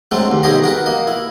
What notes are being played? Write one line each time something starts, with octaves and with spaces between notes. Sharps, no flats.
F#3 G#3 A3 C4 D4
D#2
B1 G3 G4 G#4 D#5 A#5
F#4 A#4 B4
A#3 D#5
E4